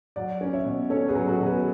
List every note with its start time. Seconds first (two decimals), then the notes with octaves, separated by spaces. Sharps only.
0.16 F#3 D5 F#5
0.41 C#4
0.53 C#5 E5
0.65 B2
0.90 C#4 A4 C#5
1.09 G#4 B4
1.15 F#3
1.27 F#4 A4
1.40 B2
1.46 G#4 B4